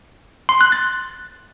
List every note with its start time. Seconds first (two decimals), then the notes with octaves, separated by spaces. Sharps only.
0.49 C6
0.61 F#6
0.72 A6